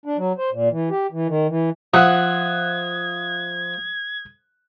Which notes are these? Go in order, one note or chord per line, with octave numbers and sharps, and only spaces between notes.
D4
F#3
C5
A#2
E3
G4
E3
D#3
E3
F3 E5 F#5 D#6 F#6 G#6